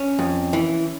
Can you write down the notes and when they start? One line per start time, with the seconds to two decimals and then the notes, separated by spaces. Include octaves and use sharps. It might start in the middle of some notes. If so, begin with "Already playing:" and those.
Already playing: C#4
0.19 F2
0.53 E3